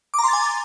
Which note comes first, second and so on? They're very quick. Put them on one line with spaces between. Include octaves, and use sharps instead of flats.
D6 A#5 C6 A6 G#5